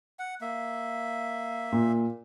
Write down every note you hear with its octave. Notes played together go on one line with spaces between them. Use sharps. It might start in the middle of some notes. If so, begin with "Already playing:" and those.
F#5
A#3 E5
A#2